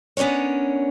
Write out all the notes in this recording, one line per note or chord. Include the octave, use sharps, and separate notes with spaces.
B3 C#4 D4 A#4 C#5